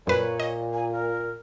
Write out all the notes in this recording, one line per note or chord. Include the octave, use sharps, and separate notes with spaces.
F#2 A#2 B4 C#5
D#5
G#5
A#4